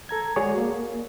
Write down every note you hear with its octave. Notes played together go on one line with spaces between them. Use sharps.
A4 A#5 G#6
G#3 F#4 G#4 C#5 D5
A#3